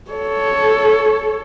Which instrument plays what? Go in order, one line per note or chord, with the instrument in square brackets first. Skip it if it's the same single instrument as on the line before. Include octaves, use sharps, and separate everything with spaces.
[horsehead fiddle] A4 C#5